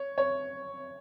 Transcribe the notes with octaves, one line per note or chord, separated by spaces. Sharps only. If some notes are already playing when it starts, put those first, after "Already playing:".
Already playing: C#5
C#5